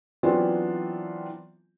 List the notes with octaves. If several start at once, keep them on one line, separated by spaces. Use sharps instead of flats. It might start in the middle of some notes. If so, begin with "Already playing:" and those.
E3 F#3 B3 C4 D4 F4